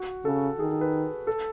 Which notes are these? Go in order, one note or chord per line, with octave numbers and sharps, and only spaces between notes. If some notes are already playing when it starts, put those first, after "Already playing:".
Already playing: F#4
C#3 A4
D#3 G#4
B4
A4